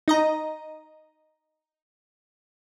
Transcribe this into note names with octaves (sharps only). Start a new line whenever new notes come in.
D#4 D#5 A#5